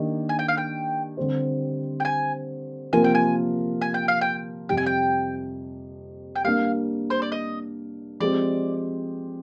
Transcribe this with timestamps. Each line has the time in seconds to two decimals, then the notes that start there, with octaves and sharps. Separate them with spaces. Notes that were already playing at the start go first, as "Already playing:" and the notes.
Already playing: D#3 A#3 D4 G4
0.29 G#5
0.39 G5
0.48 F5
0.57 G5
1.17 D3 G3 C4 G4 C5
2.00 G5
2.05 G#5
2.93 C3 F3 A#3 F4 A#4 G#5
3.04 G5
3.15 G#5
3.81 G#5
3.94 G5
4.08 F5
4.21 G5
4.69 F2 C3 G3 G5
4.78 G#5
4.86 G5
6.36 G5
6.44 G3 A#3 D4 F5
7.10 C5
7.22 D5
7.32 D#5
8.20 F3 G#3 C4 G4 D5